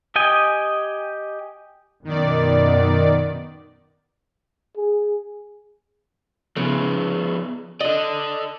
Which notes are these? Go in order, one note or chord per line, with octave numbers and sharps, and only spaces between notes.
G4 D#5 G5 G#5
F#2 B2 D#3 B3 D5
G#4
C#3 F3 B3
A4 D5 D#5